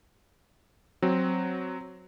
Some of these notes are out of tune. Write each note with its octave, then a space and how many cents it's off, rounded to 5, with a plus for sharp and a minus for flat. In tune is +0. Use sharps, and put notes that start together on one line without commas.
F#3 +0 C4 +0